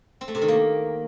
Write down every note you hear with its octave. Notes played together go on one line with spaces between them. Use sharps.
C4
A3
C3
D#3
A#3